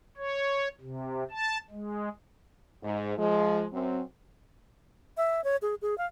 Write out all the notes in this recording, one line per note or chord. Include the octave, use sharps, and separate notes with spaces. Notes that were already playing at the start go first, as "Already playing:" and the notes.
C#5
C3
A5
G#3
G#2
F3 G#3
F#2 C4
E5
C#5
G#4
G#4
F5